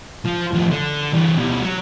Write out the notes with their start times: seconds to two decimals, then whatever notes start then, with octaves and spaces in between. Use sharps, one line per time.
0.25 F3
0.53 A2 F3
0.71 D3
1.14 G2 E3
1.37 B2 G3
1.63 F#3